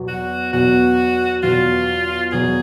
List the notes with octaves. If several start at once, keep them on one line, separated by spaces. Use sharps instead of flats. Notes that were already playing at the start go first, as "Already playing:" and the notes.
Already playing: E2 B2 F#3
F#4
E2 B2 F#3 F#4
E2 B2 F#3 F4
E2 B2 F#3 G#4